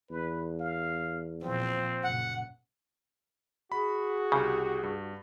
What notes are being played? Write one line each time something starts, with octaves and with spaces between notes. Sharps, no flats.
E2 B4
F5
A#2 F3 C4
F#1 A#2 F#5
F#4 G#4 B5
C2 C#3 G4
G2